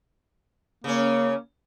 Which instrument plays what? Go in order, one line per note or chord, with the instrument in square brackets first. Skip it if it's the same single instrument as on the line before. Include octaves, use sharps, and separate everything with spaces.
[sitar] C#3 C#4 [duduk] A#3